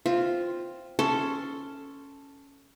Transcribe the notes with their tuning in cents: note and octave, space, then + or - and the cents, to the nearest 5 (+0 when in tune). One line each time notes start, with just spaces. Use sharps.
C4 +0 F4 +0
C#4 +5 A4 +0 C6 +0